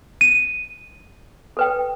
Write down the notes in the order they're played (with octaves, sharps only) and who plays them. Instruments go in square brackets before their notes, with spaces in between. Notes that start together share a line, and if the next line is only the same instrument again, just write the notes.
[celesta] D#7
[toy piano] A4 B4 G5